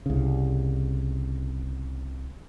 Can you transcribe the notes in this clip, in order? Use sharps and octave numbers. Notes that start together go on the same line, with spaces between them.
C2 C#3